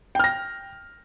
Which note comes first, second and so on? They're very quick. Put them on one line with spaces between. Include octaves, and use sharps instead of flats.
G5 F6 A#6